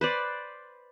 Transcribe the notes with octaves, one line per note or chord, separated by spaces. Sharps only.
B4 C5 D5